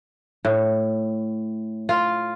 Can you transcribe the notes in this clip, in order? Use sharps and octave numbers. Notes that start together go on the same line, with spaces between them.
A2
F4